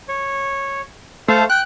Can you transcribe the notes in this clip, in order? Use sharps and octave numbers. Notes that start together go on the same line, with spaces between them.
C#5
A3 A4 C5 F5
G5 F#6